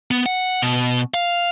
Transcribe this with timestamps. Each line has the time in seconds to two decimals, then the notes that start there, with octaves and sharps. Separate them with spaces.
0.11 B3
0.26 F#5
0.62 B2
1.14 F5